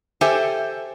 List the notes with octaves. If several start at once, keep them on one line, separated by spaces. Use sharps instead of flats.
G4 A4 C5 E5 G5 G#5